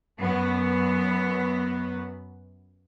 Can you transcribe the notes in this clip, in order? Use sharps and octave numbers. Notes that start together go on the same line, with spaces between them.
F#2 B3